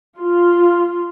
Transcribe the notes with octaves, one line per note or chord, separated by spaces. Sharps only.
F4